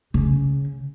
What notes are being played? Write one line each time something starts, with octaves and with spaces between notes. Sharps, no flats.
C#3